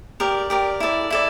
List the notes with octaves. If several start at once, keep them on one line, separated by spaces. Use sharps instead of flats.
G4 A#4 D5
G4 A#4 D5
E4 A4 D5
E4 A4 D5